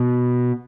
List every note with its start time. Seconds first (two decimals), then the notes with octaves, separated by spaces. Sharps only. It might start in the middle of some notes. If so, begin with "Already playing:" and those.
Already playing: B2